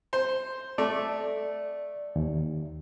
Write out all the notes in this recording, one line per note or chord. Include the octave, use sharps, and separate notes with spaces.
C5
A3 D5
D#2